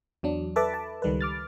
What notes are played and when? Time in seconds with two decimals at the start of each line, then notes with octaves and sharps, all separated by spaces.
0.23 E2 F#3 D4
0.56 A4 B4 E5 A5 B5 D6
0.74 A5
1.02 C#2 D#3 G3 A4 B4
1.21 D6 F6 A6